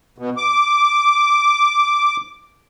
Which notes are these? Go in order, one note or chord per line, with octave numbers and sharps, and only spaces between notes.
B2
D6